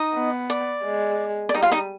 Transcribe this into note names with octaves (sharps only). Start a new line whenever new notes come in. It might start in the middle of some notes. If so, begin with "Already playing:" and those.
Already playing: D#4 D#5
B3
D5
G#3
D5
G3 D#4 D#5
F4 F5
D#4 D#5